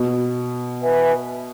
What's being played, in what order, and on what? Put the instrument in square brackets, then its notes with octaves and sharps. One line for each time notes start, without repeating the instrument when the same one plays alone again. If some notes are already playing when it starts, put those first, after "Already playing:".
Already playing: [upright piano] B2
[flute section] B4 E5 G#5